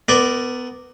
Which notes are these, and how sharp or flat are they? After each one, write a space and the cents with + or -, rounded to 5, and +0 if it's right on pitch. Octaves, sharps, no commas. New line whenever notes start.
B3 +20 A#4 -15 D5 +0